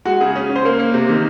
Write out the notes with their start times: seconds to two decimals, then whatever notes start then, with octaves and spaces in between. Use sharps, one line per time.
0.05 G#3 F#4
0.21 C#3 G#4
0.36 C#4
0.49 C#4
0.56 C5
0.65 A#3 A#4
0.79 A#3
0.94 C3
1.09 D#3